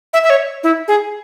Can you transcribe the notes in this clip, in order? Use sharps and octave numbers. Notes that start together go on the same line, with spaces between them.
E5
E5
C#5
E4
G#4